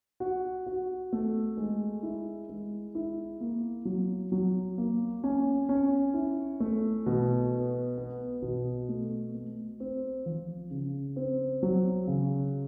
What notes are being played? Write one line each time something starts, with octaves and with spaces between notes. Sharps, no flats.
F#4
F#4
A3
G#3
E4
G#3
E4
A#3
F#3
F#3
A#3
C#4
C#4
E4
A3
B2
B3
B3
B2
A3
A3
C4
F3
C#3
C4
F#3
C#3